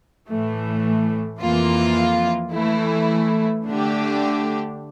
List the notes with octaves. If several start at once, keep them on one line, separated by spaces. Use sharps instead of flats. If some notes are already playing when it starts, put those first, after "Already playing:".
A2 E3 A3
F2 E3 A#3 F4
E3 A3 E4
D3 A3 D4 G4